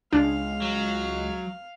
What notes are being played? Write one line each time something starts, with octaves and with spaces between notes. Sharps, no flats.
C#2 G#3 D4 F5
F#3